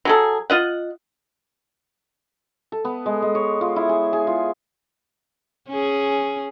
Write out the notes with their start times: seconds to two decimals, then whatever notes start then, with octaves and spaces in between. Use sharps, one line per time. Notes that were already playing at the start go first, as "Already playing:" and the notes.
0.05 F#3 G#4 A4
0.50 F4 D#5 F#5
2.72 A4
2.85 B3
3.06 G#3
3.22 G#3
3.35 C#5
3.61 F4
3.76 E4
3.89 G#4
4.13 G#4
4.27 F4
5.69 C#4 G#4